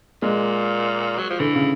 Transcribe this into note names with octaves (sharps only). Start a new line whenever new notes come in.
A#2 G#3
F#3
F3
D3 E3
C#3